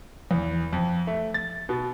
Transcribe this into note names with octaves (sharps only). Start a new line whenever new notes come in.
E2
F2
A3
A6
B2